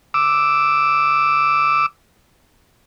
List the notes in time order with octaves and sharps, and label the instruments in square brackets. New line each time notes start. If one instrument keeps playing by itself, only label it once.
[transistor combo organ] D6 E6